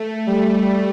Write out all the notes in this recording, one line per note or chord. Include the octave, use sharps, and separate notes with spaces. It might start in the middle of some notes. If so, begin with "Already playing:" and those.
Already playing: A3
G3